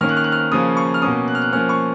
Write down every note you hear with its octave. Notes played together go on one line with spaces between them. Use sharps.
D#3 A#3 C#4 F6
F#6
F6
F#6
F6
C#3 F3 A#3 C#4 D#6
C#6
F6
B2 A#3 C#4 D#6
F#6
F6
F#6
F3 A#3 C#4 F6
C#6